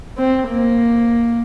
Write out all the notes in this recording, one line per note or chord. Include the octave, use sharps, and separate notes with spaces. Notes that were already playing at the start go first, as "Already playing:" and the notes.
C4
A#3